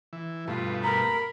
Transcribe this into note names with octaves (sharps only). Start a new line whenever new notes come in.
E3
G2 B2 A3 F4
A#4 A#5 B5